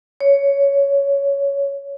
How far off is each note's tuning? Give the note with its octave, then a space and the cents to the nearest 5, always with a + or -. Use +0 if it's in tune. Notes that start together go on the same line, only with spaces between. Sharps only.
C#5 +10